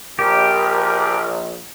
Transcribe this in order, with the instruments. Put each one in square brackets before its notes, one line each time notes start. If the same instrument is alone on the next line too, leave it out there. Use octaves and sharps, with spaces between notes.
[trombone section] A#1 [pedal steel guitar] G4 [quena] A#4